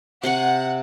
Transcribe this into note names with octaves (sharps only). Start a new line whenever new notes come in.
C3 F#5 C6 C#6